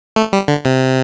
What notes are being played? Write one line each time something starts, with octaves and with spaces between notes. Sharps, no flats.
A3
G3
D3
C3